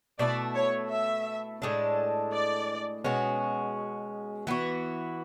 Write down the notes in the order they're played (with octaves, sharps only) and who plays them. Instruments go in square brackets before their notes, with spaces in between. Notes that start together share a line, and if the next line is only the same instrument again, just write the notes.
[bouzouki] B2 A3 E4 [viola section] D5
[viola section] C#5
E5
[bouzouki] A2 G#3 D4 A4
[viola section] D5
[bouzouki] B2 G#3 C#4 F#4
E3 B3 F#4